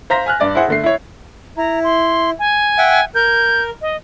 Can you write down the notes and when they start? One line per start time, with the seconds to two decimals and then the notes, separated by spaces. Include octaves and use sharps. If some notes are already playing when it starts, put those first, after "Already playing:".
0.10 C5 F5 A#5 C6 A#6 B6
0.26 G#5 F6 F#6
0.40 G2 D5 A6
0.55 E4 G#4 C5 F#5
0.68 D3 A3 C7
0.84 E4 C#5
1.57 E4 A#5
1.84 C6
2.39 G#5
2.78 E5 F#5 G5
3.15 A#4 G6
3.81 D#5